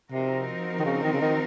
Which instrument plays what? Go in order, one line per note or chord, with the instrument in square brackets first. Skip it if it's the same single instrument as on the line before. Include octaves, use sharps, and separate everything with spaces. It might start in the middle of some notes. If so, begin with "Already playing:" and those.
[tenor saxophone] C3 [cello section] F3 C4 D#4 F#4 A#4
[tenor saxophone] D#3
C#3
D#3
C#3
D#3